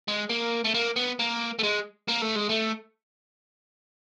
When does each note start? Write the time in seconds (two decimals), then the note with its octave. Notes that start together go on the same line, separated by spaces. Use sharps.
0.08 G#3
0.30 A#3
0.65 A3
0.75 A#3
0.96 B3
1.20 A#3
1.59 A3
1.63 G#3
2.08 A#3
2.22 A3
2.35 G#3
2.49 A3